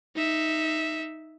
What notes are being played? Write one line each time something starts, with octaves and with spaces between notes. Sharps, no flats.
D#4 E5